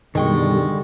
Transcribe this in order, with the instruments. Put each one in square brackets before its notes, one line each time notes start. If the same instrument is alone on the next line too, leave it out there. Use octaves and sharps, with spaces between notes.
[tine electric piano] F#2 B2 [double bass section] D3 G3 [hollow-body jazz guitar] D#3 [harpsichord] G#3 G5 C#6